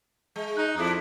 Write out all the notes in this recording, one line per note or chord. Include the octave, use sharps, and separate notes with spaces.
G#3
D#4 F#6
F2 D4 E4 D#6